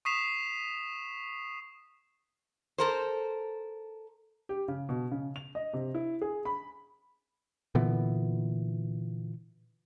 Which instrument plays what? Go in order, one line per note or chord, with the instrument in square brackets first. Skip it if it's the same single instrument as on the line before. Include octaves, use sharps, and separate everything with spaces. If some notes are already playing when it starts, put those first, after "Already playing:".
[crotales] C#6 D#6 B6 C7 E7 F7
[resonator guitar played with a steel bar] A4 A#4 C5
[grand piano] G4
C#3
B2
C#3
F7
D#5
C3
E4
G#4
B5
[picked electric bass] A#2 D3 E3 B3